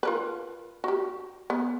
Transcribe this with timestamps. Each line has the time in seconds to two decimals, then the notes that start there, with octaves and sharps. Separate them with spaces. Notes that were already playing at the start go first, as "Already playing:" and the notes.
0.03 F4 A#4 B4
0.84 F#4 G4
1.50 B3